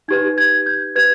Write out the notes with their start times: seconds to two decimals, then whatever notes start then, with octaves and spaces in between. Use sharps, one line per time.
0.08 D#4 G4 B4 G#6
0.38 G#6
0.66 G6
0.96 G4 B4 G#6